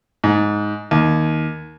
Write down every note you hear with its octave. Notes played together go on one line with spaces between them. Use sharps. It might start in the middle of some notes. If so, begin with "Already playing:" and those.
G#2
D#2